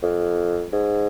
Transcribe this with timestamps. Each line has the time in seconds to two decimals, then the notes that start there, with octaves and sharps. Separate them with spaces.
0.02 F2
0.72 G#2